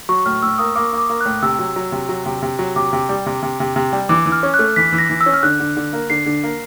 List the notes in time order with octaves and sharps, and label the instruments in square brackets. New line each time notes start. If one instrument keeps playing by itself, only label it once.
[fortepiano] F#3 [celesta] C#6
[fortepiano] A2 [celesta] F6
[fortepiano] A2 [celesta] E6
[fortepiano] A#3 [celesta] D#6
[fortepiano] A#3 [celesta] D6
[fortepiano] A#3 [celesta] D6
[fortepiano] A#3
[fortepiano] A2 [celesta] F#6
[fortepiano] C3 [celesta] E6
[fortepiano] F#3
F#3
C3
F#3
C3
C3
F#3
[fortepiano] C3 [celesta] D6
[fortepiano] C3
G3
C3
C3
C3
C3
G3
[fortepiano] E3 [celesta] D6
[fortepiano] E3
[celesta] F6
[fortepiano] C#4
[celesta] F#6
[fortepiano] A3
[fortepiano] E3 [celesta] B6
[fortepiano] E3
[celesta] A#6
[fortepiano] E3
[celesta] E6
[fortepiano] C#4
[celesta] F6
[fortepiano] D3 [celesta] F#6
[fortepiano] D3
D3
A#3
[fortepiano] D3 [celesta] C7
[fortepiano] D3
A#3